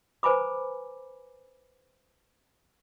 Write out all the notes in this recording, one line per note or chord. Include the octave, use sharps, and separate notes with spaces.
B4 C5 G#5 A#5 B5 D6